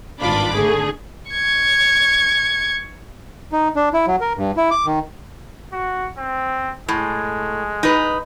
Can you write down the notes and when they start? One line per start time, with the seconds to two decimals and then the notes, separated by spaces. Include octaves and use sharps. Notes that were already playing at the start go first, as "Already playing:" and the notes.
0.20 G#1 G2 D4 F4 B5 D6
0.54 D3 A3 G#4
1.31 C#6 G#6
3.52 D#4
3.76 D4
3.93 E4
4.07 F#3
4.21 A#4
4.37 G2
4.57 E4
4.71 D6
4.86 D#3
5.72 F#4
6.17 C4
6.88 A2 G#3
7.83 D#4 B4